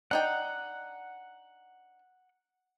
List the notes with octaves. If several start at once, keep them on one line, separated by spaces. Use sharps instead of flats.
D4 D#4 F#5 G5